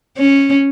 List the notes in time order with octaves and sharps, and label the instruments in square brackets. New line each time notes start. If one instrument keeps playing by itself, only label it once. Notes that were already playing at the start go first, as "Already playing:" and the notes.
[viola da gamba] C#4